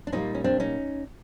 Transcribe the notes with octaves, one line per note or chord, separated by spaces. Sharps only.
D4
A#2 G3 A#3 C#4 D#4
C#4
C4 D4
C#4 D#4